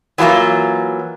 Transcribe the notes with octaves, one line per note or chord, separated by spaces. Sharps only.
E3 F#3 G#3 A#3 F4